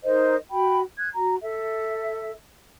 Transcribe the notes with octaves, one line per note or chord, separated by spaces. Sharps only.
D#4 A#4 C5 D#5
F#4 G5 B5
F#6 G#6
F#4 A#5
A4 E5